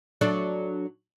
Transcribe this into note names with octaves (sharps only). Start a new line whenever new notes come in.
F#3 D4 A4